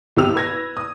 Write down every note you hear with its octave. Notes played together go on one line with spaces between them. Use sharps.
B1 C3 B3 G4 E6 F7
B4 G#6 A#6
D#6